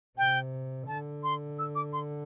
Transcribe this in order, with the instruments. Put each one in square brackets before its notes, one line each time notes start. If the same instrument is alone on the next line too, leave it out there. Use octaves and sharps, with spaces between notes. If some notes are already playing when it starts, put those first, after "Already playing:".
[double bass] C3 [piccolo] G5
[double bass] D3 [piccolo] A5
[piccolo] C6
E6
D6
C6